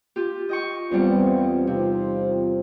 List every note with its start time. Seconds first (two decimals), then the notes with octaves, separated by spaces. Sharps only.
0.16 F4 G4
0.49 D#5 G5 C#6
0.91 E2 G3 B3 C4 F4
1.67 C3 C4 D#4 F4